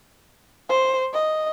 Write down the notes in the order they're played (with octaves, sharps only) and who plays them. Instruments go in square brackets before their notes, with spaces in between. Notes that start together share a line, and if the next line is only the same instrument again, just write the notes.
[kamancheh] C5
D#5